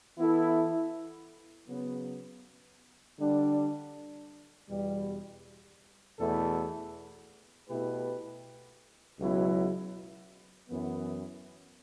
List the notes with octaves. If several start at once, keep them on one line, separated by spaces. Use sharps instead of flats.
E3 B3 E4 A4
C#3 F#3 B3
D3 G3 D4
E2 B2 G3
E2 B2 A3 E4 A4
B2 A3 E4 G4 B4
C#2 B2 F#3 B3 E4
F#2 E3 B3